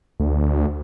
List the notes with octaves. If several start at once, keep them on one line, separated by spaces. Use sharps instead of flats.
D2